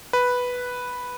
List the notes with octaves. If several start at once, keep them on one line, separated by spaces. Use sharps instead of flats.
B4